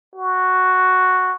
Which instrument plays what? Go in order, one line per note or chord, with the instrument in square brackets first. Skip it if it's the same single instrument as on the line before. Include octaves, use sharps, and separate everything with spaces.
[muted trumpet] F#4